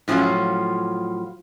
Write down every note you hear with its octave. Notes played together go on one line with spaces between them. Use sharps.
A2 F3 F#3 C#4 F4